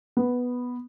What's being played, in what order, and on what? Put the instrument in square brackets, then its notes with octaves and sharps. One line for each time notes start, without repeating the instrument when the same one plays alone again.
[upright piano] B3